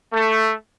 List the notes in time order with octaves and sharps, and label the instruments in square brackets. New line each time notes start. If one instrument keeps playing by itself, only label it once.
[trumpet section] A3